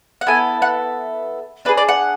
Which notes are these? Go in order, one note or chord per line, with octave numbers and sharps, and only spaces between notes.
F#5
B3 E4 A4 G#5
F#5
D4 G#4 B4
D5
F#5